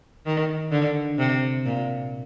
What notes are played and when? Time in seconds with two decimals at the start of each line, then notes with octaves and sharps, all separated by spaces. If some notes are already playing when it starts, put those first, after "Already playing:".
0.26 D#3
0.72 D3
1.19 C3
1.65 A#2